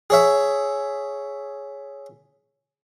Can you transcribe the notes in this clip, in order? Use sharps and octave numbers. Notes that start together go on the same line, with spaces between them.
G#4 C#5 E5